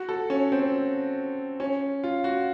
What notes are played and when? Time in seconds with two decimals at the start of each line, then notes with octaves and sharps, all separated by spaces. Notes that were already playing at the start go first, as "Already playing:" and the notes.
Already playing: F#4
0.09 A4
0.30 C#4
0.52 C4
1.60 C#4
2.04 F4
2.24 F#4